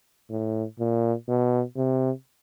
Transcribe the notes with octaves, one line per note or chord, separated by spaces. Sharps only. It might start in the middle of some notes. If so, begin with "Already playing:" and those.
A2
A#2
B2
C3